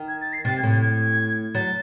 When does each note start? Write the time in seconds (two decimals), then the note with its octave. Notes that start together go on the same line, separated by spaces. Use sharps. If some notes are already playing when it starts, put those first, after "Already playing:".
Already playing: D#3
0.08 G#6
0.21 A6
0.33 C7
0.45 C3 A6
0.57 G#6
0.63 A2
0.70 G#6
0.81 G#6
1.55 F#3 A6